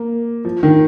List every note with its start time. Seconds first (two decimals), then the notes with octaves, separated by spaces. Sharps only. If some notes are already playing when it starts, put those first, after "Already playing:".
Already playing: A#3
0.45 F3
0.63 D#3